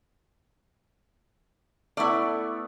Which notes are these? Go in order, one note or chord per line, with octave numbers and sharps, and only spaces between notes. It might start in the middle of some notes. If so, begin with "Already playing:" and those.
A3 B3 E4 D5